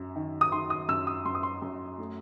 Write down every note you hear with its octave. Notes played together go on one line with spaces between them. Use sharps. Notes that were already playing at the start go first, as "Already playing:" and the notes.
Already playing: F#2
D#3
D#6
D#3 C6
D#6
F#2 E6
D#6
F#2 C6
D#6
C6
F#2
A3